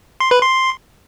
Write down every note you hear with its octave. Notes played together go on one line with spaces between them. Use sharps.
C6
B4
C6